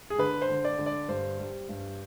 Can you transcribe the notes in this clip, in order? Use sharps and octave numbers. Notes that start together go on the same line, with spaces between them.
G#4
D3 B4
C5
D3
D5
D3
D5
G2 C5
G3
G2